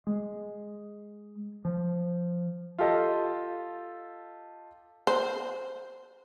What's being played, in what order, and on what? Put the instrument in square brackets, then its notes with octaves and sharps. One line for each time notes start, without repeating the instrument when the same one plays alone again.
[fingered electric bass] G#3
F3
[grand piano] F4 G4 A4 D#5
[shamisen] C5